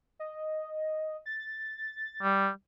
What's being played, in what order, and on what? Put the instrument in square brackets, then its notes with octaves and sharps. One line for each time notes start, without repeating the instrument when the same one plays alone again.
[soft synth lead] D#5
A6
[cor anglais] G3